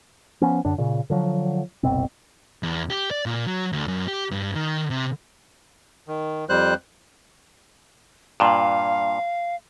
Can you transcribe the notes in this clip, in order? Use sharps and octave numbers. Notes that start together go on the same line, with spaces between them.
F3 B3 C#4
F#2 D3 D4
A#2 C#3
D3 F3 F#3
F#1 C2 B2 C4
E2
G4
D5
A#2
F#3
D2
F#2
G4
G2
D#3
C3
D#3
F2 G3 C5 F#6
G2 A#2 F5